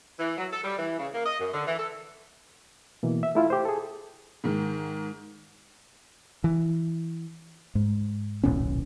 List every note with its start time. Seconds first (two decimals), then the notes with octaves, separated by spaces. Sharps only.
0.19 E3
0.38 F#3
0.52 A4
0.64 G3
0.78 E3
0.99 C#3
1.14 A#3
1.26 D#5
1.40 F#2
1.54 D3
1.67 E3
1.79 A4
3.03 B2 E3 A#3
3.23 E5
3.35 A3 E4 F4
3.50 G4 C5
3.65 G#4 A4
4.44 G#2 D#3
6.44 E3
7.75 G#2
8.43 D#1 B1 A2 C#4